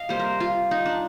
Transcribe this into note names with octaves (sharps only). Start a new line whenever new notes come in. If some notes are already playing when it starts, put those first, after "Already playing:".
Already playing: D#5 F5
C3 G3 A#3 C5
A#4
F4
D#4
D4